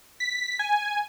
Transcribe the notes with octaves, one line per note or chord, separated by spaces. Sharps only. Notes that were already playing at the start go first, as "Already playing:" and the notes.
B6
G#5